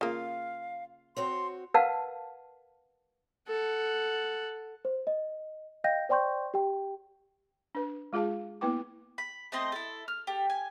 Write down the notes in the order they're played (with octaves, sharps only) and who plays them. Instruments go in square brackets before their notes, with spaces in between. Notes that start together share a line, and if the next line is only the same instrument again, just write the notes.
[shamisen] C#3 A#3 [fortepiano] F4 [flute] F5
[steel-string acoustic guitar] C4 F#4 C#5 [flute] C6
[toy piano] A#4 B4 F5 F#5 A5
[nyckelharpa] A4 F#5
[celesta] C5
D#5
D#5 F5 G5 G6 A#6
C5 D5 G5 C6 C#6 G6
G4 G5
[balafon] D4 B4
G#3 F4 G#4 F5 A5
A#3 B3 E4 B4 G5 D6
[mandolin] B5
A3 C4 D#5 C6
E4 A4
F6
G4 A4
G#5